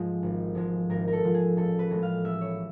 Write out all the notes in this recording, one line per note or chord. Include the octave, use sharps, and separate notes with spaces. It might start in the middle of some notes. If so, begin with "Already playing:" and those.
Already playing: G#2 F3 G#3 G#4
G#1
G#2 F3 G#3
G#1 A#4
A#4
A4
G#2 F3 G#3
G#4
A1 A4
B4
A2 E3 G#3 B3
F5
A1 E5
C#5